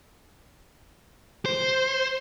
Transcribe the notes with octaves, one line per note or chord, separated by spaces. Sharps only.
C5